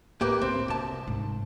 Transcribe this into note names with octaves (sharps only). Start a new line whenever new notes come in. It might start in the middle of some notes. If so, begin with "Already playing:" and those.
A2 A#3 G4 B4
C4 D4 D#4
C2 F4 A5
G#2